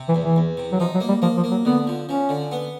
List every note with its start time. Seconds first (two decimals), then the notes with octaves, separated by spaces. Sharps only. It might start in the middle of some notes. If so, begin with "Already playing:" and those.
Already playing: C3
0.09 E3
0.15 E2
0.22 E3
0.36 E2
0.57 C3
0.72 F#3
0.80 F3 D#4
0.94 F#3
1.00 A#3
1.08 G3
1.22 F3 A#3
1.37 F3
1.44 A#3
1.51 F#3
1.65 D3 B3
1.87 F3
2.08 F3 C#4
2.29 D3
2.52 B3